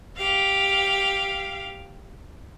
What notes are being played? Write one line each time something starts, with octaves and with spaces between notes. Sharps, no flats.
G4 F5